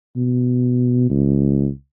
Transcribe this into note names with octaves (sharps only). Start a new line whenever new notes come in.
B2
C#2